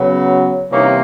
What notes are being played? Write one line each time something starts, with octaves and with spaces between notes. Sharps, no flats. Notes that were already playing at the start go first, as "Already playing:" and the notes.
Already playing: C#3 F#3 B3
C3 E3 G3 A#3 C#4 D#4